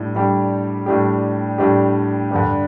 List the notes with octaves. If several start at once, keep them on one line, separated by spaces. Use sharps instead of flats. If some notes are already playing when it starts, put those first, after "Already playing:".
Already playing: A2 G3 D4
A2 G3 D4 G4
A2 G3 D4 G4
A2 G3 D4 G4
G2 D3 G3 D4